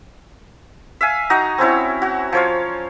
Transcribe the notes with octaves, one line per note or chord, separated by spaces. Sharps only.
E5 F5 G#5
D#4 F#4 D#5 A#5
C4 C#4 E4 C#5
F#4
F3 C#5 F5